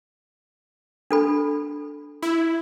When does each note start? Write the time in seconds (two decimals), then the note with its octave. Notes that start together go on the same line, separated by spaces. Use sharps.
1.11 D4 A4 B5
2.23 E4